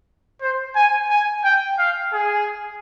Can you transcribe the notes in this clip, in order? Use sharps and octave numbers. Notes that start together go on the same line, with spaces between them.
C5
G#5
G#5
G5
F5
G#4